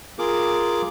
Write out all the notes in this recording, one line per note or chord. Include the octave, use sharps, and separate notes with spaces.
F4 G#4 A#4 D6